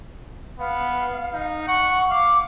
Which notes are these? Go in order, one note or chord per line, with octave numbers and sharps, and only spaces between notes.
B3 F5
D#4
F#5 C#6
F5 D6